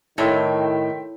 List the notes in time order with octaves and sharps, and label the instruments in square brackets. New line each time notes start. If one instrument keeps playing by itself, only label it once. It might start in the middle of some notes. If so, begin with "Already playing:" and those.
[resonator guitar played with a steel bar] A2 [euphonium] D#3 [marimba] E4 A4 C#5 [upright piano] E5 G5 C6